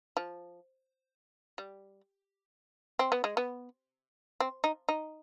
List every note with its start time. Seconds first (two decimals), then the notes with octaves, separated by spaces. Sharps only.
0.17 F3
1.58 G3
2.99 C4
3.12 B3
3.24 G#3
3.37 B3
4.40 C4
4.64 D#4
4.89 D#4